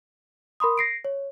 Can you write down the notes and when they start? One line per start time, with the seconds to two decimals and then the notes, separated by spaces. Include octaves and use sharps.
0.60 A#4 B5 C6 D#6
0.78 A#6 C7 D7
1.05 C#5